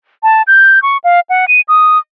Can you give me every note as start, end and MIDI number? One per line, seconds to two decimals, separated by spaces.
0.23 0.42 81
0.47 0.82 91
0.82 0.98 85
1.04 1.20 77
1.30 1.46 78
1.48 1.61 99
1.68 1.98 87